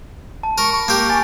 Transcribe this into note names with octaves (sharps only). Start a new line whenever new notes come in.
A5
A#4 C#6
B5 C#6
A#3 G4
G#5 A6